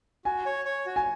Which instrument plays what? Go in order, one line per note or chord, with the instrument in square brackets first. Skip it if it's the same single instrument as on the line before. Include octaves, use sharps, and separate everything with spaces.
[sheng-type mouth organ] F#4 [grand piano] G#5
[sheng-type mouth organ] C#5
C#5
F#4
[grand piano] G#5